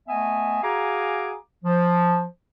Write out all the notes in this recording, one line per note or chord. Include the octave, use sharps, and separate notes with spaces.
A3 B3 D#5 E5 G#5
F#4 G#4 F5 G#5 A#5 D6
F3